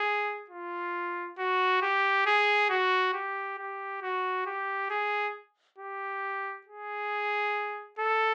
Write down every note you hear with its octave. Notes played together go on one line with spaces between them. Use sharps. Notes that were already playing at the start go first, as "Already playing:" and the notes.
Already playing: G#4
F4
F#4
G4
G#4
F#4
G4
G4
F#4
G4
G#4
G4
G#4
A4